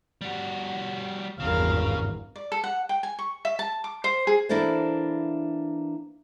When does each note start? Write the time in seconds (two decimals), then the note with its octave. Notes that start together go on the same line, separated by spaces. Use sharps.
0.21 G3 F#4
1.40 G#1 E2 G2 C#3 A#4 F5
2.36 D5
2.52 A4
2.64 F#5
2.89 G5
3.03 G#5
3.19 C#6
3.45 E5
3.59 A5
3.84 D6
4.04 C5
4.27 G#4
4.49 E3 A#3 D4 E4 A4 C5